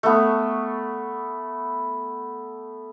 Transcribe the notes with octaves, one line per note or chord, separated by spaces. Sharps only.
A3 B3